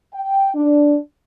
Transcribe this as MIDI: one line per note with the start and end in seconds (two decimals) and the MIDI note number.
0.14 0.52 79
0.55 0.97 62